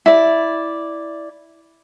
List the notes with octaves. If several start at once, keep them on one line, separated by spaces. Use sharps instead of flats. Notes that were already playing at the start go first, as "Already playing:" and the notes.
E4 D5